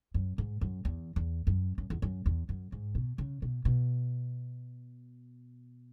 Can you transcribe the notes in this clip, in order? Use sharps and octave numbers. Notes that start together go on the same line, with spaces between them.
F#2
G#2
F#2
E2
E2
F#2
F#2
E2
F#2
E2
F#2
G#2
B2
C#3
B2
B2